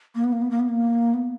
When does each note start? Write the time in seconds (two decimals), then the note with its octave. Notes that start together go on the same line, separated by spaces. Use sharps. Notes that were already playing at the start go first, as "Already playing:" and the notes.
0.15 A#3
0.24 B3
0.33 A#3
0.42 B3
0.51 A#3
0.60 B3
0.69 A#3
1.14 B3